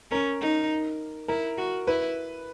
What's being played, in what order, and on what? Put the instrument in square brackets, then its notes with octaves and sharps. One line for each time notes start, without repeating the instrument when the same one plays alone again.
[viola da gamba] C#4 [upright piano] A#4
[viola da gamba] D#4
[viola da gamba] E4 [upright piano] A#4
[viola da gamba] F#4
[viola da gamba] E4 [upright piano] B4